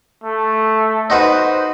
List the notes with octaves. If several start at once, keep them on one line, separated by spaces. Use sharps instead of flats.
A3
D#4 F#4 B4 C5